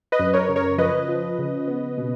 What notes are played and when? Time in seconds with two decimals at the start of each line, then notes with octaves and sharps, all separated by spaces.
0.12 B4 D#5
0.19 F#2
0.34 A#4 C#5
0.49 C#3
0.56 A#4 C#5
0.78 F3 B4 D#5
1.08 F3
1.39 C#3
1.68 B3
1.98 B2